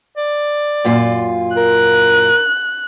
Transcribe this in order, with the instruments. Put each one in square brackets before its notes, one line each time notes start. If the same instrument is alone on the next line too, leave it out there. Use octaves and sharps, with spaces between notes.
[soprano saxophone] D5
[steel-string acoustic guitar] F#2 A#2 F4
[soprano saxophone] A#4 [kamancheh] F#6